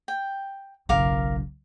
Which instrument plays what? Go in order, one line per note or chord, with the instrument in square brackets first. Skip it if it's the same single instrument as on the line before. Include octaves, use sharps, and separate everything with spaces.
[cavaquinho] G5
[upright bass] F#1 B1 [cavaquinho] A#4 F5 D6